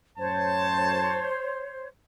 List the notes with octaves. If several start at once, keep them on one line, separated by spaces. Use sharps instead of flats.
F#2 A2 C5 C#5 A5